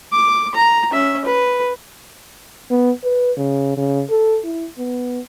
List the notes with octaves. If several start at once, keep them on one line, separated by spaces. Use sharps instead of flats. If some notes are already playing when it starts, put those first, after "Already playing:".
D6
A#5
C#4 E5
B4
B3
B4
C#3
C#3
A4
E4
B3